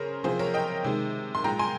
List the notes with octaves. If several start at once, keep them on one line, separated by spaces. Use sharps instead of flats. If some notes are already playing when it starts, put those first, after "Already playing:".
Already playing: C#3 G#4 A#4 C5 C#5
C3 F3 A#3 G#4 C5
A#4 C#5
D#5 G5
C3 D#3 G#3
C6
A#2 G#3 G5 A#5
G#5 C6